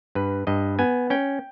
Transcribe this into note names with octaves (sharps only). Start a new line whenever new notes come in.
G2 B4
G2 D#5
B3 G#5
C#4 G5